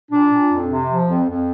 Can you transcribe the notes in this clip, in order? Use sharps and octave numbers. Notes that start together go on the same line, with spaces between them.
A#2 D4
A#2
F2
C3
F3
F2
F2